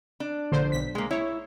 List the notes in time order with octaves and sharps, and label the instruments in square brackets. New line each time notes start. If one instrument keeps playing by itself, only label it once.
[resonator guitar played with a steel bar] D4
[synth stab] A#1 D3 C5
B1 B6
[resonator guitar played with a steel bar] G#3 A#3
[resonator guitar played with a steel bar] E4 [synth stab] C#5